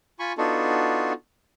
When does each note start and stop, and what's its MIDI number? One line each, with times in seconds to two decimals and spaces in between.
0.19 0.33 65
0.19 0.33 80
0.19 0.33 83
0.19 0.33 85
0.38 1.13 59
0.38 1.13 62
0.38 1.13 63
0.38 1.13 65
0.38 1.13 66
0.38 1.13 69